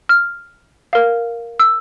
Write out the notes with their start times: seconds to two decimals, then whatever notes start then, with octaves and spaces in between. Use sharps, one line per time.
0.09 F6
0.93 A#4 F5
1.60 E6